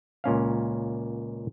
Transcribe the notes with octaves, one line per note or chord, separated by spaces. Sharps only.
C#2 A#2 C#4 F5